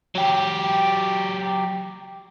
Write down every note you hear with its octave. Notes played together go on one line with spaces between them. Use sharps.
F#3 G4